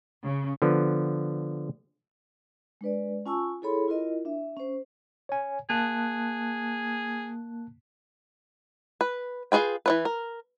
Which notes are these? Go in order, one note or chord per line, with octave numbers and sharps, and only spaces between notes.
C#3
D3 F3 B3
G#3 D4 B4 D5
C#4 F4 G#5 A5 C#6 E6
E4 G#4 A4 C#5 B5 C6
E4 F4 A#4 D#5
D4 E5
C#4 C5
C#5 G#5
A#3 G#4 A5 F#6
B4
F4 F#4 G#4 B4 G5
E3 F3 B4
A#4